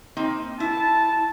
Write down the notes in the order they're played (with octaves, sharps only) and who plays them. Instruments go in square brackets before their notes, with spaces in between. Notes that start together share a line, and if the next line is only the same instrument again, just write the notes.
[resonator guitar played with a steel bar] A#3 C4 D#4
[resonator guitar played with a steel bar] E4 [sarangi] A5